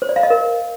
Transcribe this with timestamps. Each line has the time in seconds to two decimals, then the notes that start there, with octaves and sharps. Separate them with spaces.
0.02 C5
0.09 D5
0.16 F5
0.23 D#5
0.30 A#4